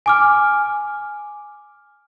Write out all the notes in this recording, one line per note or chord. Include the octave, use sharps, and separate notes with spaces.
G#5 D6 F6